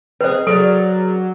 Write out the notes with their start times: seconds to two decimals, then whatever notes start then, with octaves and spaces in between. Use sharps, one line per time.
0.21 C4 D#4 G#4 B4 C5
0.47 C#3 F#3 A4 A#4 D5